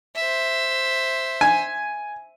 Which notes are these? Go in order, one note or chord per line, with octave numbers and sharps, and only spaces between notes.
C5 E5
G#5